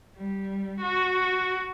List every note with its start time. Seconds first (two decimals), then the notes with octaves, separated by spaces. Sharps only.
0.17 G3
0.81 F#4